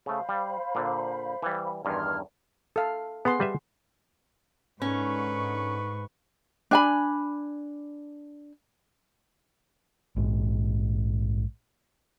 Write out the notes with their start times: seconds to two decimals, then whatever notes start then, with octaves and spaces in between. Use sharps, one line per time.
0.06 C#3 A3 C5 F5 B5
0.29 G3
0.75 A#2 D3
1.42 E3 G3
1.85 E2 G2 D#3 C6 F6 G#6
2.76 A4 F5
3.25 B3 G#4 F#5 C6
3.40 G3 B4 E5
4.82 G#2 D3 C#4 D#4 B4 C#6
6.71 D4 G#5 B5
10.16 A#1 G#2